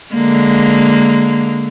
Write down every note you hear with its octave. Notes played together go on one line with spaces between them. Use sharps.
D3 G#3 A#3